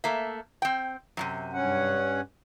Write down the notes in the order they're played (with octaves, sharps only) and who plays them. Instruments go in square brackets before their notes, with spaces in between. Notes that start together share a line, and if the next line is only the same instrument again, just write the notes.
[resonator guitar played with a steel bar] A3 A#3 E5
C4 G5
F#2 A2 C3
[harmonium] G2 C#4 F#5